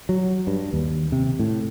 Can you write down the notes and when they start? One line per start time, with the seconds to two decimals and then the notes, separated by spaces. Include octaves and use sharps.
0.09 F#3
0.47 G2
0.73 D#2
1.12 C3
1.39 A2